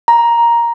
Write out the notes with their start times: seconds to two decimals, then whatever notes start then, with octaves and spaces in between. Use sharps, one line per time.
0.08 A#5